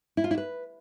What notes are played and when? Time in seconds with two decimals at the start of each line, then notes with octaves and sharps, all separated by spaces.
0.17 E4
0.24 F4
0.31 E4
0.38 B4